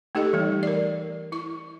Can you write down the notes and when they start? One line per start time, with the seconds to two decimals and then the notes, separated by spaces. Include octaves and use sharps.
0.15 A3 D#4 G4 A4 D#5
0.33 E3 G3 A3
0.63 A#4 D5
1.32 E4 C#6